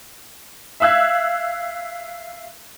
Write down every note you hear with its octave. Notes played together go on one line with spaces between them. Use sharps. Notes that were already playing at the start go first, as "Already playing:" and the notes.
E5 F5 E6 F#6 G#6